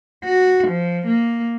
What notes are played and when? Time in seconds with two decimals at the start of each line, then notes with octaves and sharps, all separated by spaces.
0.25 F#4
0.68 F3
1.07 A#3